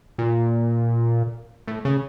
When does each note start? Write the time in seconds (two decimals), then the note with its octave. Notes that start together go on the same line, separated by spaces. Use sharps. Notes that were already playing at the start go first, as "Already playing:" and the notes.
0.18 A#2
1.68 A2
1.85 C#3